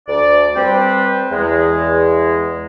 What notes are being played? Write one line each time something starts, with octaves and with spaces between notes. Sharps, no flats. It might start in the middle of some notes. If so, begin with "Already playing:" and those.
D2 D5
G3 C4 B4 C5
E2 G#3